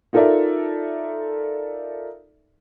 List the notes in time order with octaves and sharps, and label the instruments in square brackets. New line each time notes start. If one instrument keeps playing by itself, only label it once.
[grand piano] D#4 F4 A4 A#4 D5 E5